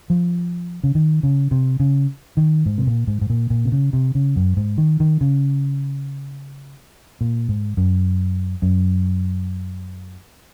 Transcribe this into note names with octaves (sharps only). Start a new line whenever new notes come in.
F3
C#3
D#3
C#3
C3
C#3
D#3
G#2
C3
A#2
G#2
G#2
A#2
A#2
C3
C#3
C3
C#3
F#2
G#2
D#3
D#3
C#3
A#2
G#2
F#2
F#2